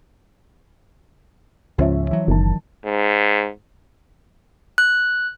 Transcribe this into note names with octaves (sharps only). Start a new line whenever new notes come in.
C#2 G#2 F3 C#4 E5
E3 F#3
F#1 D#3 A5
G#2
F#6